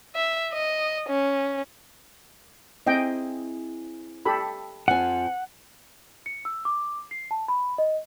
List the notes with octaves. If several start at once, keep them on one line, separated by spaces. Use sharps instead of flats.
E5
D#5
C#4
C4 E4 G#4 D#5 G5
G4 A4 B5
F2 F3 F#5 G#5
C#7
E6
D6
C7
A5
B5
D#5